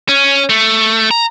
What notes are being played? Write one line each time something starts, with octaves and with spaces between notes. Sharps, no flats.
C#4
A3
A#5